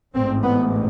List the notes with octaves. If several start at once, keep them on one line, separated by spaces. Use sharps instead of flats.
A1 G#2 C4
B3